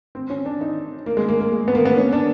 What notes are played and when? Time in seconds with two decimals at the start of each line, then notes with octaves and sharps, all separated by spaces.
0.15 C4
0.30 C#4
0.46 D4
0.61 D#4
1.06 A#3
1.17 G#3
1.29 A#3
1.40 A#3
1.52 G#3
1.68 B3
1.75 A#3
1.85 B3
1.97 C#4
2.13 D4